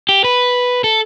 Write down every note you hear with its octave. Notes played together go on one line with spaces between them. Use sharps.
G4
B4
A4